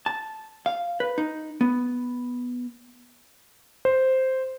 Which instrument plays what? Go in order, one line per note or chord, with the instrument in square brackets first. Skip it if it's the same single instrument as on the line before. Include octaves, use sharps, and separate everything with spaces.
[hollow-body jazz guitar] A5
F5
B4
D#4
B3
[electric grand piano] C5